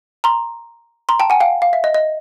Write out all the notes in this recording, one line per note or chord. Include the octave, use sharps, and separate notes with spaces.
A#5 C6
A#5 C6
G5 A5
F#5 G#5
F5 G5
F5
E5
D#5
D#5